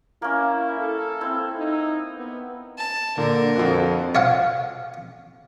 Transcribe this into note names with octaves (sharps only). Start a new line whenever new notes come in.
A#3 C#4 E4
A4
C4 E4
D#4
B3
A5
A#2 D3 A#4
F2 F4 F#4
C#5 F5 F#5